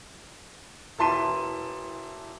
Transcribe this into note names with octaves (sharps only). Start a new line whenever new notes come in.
E1 E3 A5 C6 B6 D#7